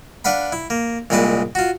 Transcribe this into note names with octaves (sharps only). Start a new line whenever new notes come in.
D4 B4 F5 F#5 B5
E4
A#3
C2 A#2 G#3 C4 B4 A5
F4 F#4